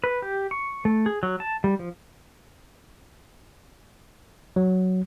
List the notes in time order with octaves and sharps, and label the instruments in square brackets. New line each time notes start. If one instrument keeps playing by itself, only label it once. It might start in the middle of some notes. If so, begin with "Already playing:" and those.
[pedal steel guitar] B4
G4
C#6
A3
G#4
F#3
A5
G3
F3
[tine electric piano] F#3